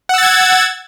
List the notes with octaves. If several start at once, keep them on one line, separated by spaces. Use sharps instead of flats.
F#5 E6 G#6 A6